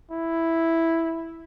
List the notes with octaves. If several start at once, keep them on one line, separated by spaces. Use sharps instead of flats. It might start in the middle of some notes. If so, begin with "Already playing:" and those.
E4